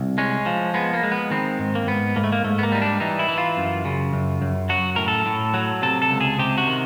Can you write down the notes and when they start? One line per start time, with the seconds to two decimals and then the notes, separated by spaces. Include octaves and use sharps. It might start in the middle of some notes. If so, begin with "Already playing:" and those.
Already playing: C2
0.18 G#3 C#4
0.46 F3
0.74 G#3 B3
0.93 A#3
1.03 G#3
1.12 B3
1.31 D#3 C4
1.59 G#2
1.75 A#3
1.87 G#2 B3
2.16 G#2 A#3
2.24 A3
2.32 A#3
2.44 G#2 A3
2.59 B3
2.63 A#3
2.72 G3 D#4
2.82 D4
3.00 E3 D#4
3.19 E4
3.29 E3
3.38 F4
3.57 F#2
3.85 C#3
4.13 F#2
4.42 F#2
4.69 F#3 F#4
4.96 A2 A#4
5.08 A4
5.26 A2
5.54 F#3
5.82 C3 A4
6.02 A4
6.11 C#2
6.21 G#4
6.39 C3 G4
6.58 F#4
6.67 D#3